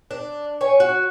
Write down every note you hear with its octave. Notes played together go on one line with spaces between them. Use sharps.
D4
C#5 G#5
F#4